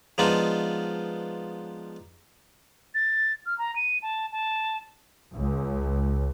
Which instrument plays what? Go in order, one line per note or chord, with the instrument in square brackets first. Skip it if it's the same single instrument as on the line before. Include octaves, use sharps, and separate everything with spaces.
[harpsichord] F3 G#3 B3 D4 D#4 F4
[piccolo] A6
F6
A#5
D#7
A5
A5
[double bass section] C#2